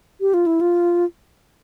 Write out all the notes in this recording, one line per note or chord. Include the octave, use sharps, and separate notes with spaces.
G4
F4
E4
F4